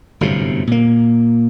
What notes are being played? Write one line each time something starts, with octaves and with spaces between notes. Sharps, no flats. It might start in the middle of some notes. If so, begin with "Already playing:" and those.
G1 F#2 A2 C3
A#2 A#3